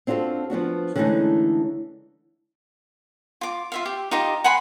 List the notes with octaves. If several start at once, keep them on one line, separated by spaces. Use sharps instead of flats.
C4 D4 F4 F#4 A4
F3 B3 D4 F#4
D3 E3 G#3 A3 C#4 D#4
F4 D6
F4 E5 F5
G4
D#4 F4 G4 D#5
F#5 G#5 B5 C6